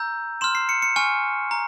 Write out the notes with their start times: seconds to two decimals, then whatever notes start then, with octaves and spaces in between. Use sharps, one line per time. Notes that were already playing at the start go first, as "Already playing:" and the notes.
Already playing: A#5 E6 G6
0.41 C6 F6 E7
0.55 C7
0.69 C#7
0.82 C#7
0.96 G#5 C#6 F6
1.51 A#5